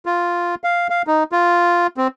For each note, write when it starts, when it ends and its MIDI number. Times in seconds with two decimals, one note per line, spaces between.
0.06 0.55 65
0.64 0.87 77
0.90 1.02 77
1.07 1.24 63
1.32 1.87 65
1.97 2.08 60